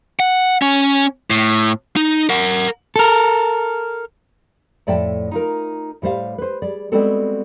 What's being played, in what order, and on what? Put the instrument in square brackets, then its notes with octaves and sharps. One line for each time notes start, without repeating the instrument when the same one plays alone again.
[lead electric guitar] F#5
C#4
A2
D#4
A#4 F#5
[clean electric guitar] A4 A#4
[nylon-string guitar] F2 A2 D5 E5 G5 A5
D#4 F4 A#4
A2 G3 C5 F5
B4 C5
G3 G#4 D5
G3 G#3 B3 C4 F#4 A4